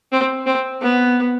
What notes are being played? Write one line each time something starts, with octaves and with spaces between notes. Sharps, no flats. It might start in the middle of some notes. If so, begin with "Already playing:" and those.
C4
C4
B3